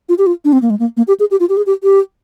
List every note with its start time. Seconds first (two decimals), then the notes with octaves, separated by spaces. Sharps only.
0.09 F4
0.18 G4
0.26 F4
0.45 D4
0.53 C4
0.62 A#3
0.70 G#3
0.79 A#3
0.97 A#3
1.08 G4
1.20 G#4
1.31 G4
1.40 F4
1.49 G4
1.57 G#4
1.66 G4
1.83 G4